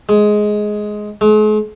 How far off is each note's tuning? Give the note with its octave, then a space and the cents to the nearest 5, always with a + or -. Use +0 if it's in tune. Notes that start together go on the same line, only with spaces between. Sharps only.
G#3 +10
G#3 +45